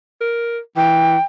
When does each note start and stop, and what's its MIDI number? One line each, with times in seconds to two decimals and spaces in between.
0.21 0.59 70
0.77 1.17 52
0.77 1.21 79